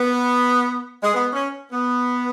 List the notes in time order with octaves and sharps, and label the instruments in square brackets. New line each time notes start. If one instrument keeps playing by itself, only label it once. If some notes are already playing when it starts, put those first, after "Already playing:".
Already playing: [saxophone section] B3
G#3
B3
C#4
B3